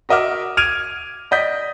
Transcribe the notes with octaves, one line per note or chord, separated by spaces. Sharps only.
F#4 A#4 D#5 E5 D6 F6
F6 G#6 D7 D#7 F7
D5 D#5 G6 B6